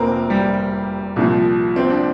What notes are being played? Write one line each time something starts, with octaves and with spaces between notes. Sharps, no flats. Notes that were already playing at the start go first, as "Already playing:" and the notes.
Already playing: F1 C3 F3 A#3 C4 A#4
G3 G4
C2 A#2 F3
C4
D4